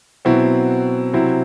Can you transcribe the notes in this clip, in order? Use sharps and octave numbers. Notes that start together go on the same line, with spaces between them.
B2 F#3 C4 E4
C3 F#3 C4 E4